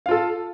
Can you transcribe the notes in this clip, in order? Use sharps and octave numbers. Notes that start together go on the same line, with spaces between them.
F4 A4 F5